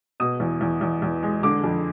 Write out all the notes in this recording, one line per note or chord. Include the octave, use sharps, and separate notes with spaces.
B2 D#6
E2
E2
E2
E2
G#3
D3 D6
F2